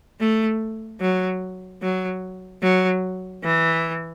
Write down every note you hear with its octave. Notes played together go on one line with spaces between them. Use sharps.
A3
F#3
F#3
F#3
E3